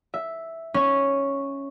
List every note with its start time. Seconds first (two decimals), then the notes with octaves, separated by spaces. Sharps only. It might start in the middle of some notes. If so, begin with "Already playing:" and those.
0.14 E5
0.74 C#4